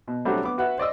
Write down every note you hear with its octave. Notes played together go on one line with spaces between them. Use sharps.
B2
F#3 G3 A3 C4 D4 F#4
B3 D6
F#4 B4 E5 F#5
C5 D5 D#5 E6